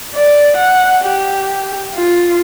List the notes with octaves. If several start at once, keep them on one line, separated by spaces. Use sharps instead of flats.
D5
F#5
G4
F4